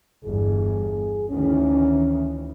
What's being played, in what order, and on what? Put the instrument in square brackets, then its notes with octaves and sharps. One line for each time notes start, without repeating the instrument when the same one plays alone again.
[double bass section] G1 E2 G2 [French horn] G#4
[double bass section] D2 D#3 E3 [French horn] C#4